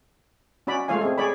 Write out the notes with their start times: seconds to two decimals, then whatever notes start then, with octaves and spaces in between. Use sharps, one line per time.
0.67 C#4 F#4 D5 B5
0.88 G#3 A3 F4 C#5 F5 G#5
1.01 C4 G#4
1.18 G#4 C#5 D5 B5